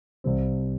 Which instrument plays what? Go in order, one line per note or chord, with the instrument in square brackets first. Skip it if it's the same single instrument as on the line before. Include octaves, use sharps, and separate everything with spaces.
[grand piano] C2 C3 G3 C4